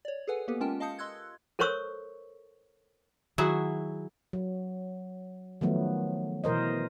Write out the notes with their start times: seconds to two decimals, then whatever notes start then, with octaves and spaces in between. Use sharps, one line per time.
0.05 C#5 D5
0.27 G#4 A4 B4 F#5 G#5
0.48 A#3 B3 G4 A4 B4
0.60 G#3 C#4 F4 A#4 G5 A5
0.80 D#5 F5 A5 D#6 G6 C#7
0.99 D#5 C6 E6 F#6 G#6
1.59 A4 A#4 C5 C#5 C#6 E6
3.38 D#3 F#3 E4 F#4 G#4
4.33 F#3
5.61 D#3 F3 F#3 A3 B3
6.44 B2 E3 A#4 C5 D#5